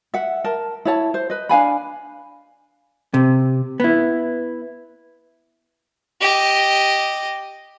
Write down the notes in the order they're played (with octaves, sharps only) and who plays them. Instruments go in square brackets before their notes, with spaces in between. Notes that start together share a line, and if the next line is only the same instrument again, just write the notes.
[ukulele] E5 F#5
A#4 A5
E4 C#5 A5
C5
B4 D#5
D4 F5 G#5 B5
[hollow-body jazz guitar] C3
B3 E4
[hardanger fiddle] G4 D#5